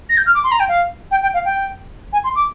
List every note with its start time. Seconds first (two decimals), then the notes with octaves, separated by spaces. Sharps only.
0.09 A#6
0.17 G6
0.26 F6
0.34 D6
0.44 C6
0.51 A#5
0.60 G5
0.68 F5
1.11 G5
1.22 G5
1.34 F5
1.45 G5
2.13 G#5
2.24 C6
2.35 D6